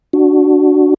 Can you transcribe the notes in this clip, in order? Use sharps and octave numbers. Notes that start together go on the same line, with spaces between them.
D4 F#4